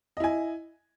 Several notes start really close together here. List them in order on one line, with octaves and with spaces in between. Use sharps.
D#5 E4 G#5